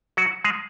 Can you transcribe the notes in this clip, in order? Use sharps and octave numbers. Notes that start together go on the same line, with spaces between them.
F#3 F#4
G#3 G#4